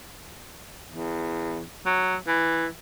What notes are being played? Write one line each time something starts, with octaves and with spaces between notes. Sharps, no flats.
E2
F#3
E3